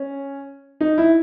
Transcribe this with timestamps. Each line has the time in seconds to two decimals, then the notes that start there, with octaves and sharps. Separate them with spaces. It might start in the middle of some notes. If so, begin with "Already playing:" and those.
Already playing: C#4
0.81 D#4
0.98 E4